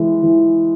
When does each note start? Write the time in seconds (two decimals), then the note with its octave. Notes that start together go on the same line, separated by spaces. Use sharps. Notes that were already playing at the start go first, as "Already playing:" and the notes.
Already playing: E3 G#3
0.23 E3